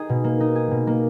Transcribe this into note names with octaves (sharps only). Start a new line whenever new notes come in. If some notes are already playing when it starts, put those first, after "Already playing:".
Already playing: D#4 G#4
B2
A#3
D#4
G#4
B2
A#3